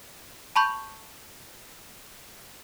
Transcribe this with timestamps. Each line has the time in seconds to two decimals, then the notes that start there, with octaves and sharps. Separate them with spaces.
0.56 A5 B5 C#6 G6